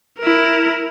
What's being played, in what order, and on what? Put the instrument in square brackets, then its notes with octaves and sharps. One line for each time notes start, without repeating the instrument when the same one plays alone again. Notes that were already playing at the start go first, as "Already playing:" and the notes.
[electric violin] E4 A#4